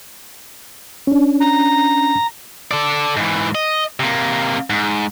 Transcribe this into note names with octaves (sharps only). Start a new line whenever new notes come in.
C#4 D4
A#5
A4 D5
G#2 E3
D#5
C3 A#3
G#2